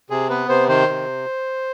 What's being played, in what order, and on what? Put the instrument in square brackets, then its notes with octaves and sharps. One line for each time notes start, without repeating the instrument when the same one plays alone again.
[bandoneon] C3 G#4
B3 B4
C3 C5
D#3 C5
C3